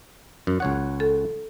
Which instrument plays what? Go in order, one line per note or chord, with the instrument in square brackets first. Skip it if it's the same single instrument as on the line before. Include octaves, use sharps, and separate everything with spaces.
[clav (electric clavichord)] F#2
C#2 C#5 F#5
[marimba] A4